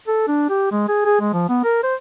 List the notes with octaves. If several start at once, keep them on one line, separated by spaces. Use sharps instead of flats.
A4
D4
G4
G#3
G#4
G#4
G#3
F3
B3
A#4
C5